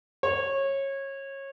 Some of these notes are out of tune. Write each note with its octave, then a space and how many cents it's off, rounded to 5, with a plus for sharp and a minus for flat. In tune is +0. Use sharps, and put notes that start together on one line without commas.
C#5 -20